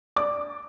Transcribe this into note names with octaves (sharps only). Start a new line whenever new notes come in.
D5 D6